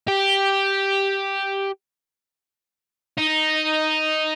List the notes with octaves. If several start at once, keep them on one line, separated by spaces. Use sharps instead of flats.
G4
D#4